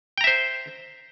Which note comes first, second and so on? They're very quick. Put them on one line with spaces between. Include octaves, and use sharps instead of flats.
G5 A#5 E5 C5